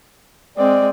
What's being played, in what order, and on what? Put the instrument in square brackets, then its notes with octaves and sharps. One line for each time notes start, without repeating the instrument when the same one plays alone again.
[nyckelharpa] G#3 C4 [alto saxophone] D5